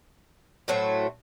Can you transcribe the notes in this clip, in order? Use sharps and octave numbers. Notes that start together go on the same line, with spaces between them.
A2 F#3 A3 C4